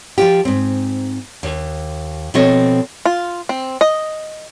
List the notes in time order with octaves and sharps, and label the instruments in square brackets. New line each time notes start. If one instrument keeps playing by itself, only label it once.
[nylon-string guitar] F3 F4 G4
G#2 C4
D#2
B2 F3 C4 A4 C#5 D#5
[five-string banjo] F4
C4
D#5